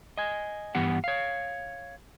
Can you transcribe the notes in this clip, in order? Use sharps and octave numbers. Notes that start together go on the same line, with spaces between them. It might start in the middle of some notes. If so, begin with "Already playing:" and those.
D#5 G#5
G2 E3 B3 G4 F#5
C#5 F5